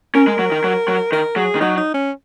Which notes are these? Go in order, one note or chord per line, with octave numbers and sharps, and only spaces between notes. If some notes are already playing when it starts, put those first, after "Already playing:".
C#4 A#4
G#3
F#3
D#3
F#3
F#3
D#3 A#4
F#3 G#4
D#3
F#3 D#4
D#4
C#4